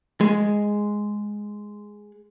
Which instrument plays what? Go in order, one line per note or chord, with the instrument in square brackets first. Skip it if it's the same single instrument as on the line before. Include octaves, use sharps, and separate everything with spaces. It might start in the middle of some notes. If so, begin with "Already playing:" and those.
[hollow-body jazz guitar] G#3